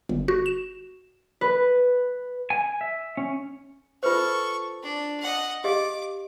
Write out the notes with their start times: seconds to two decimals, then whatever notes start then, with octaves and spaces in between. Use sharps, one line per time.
0.09 G1
0.28 F#4
0.46 E7
1.41 B4
2.50 G#5
2.81 E5
3.17 C#4
4.03 F4 A4 B4 C5 C#6
4.82 D4
5.22 D#5 F#5
5.64 G4 D#5 F5 D6